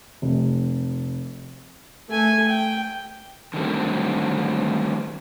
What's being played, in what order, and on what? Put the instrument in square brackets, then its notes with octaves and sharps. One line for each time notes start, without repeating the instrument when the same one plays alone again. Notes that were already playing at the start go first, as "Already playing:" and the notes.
[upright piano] F1
[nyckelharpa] A3 G#5
G5
[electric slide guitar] D3 D#3 F#3 G3 A3 C4